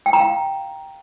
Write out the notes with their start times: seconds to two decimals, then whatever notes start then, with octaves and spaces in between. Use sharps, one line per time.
0.06 G5
0.13 A#5
0.20 F5